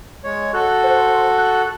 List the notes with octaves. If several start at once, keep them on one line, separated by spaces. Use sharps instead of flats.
G#3 C#5
F#4 A4 F#6
C5
F#6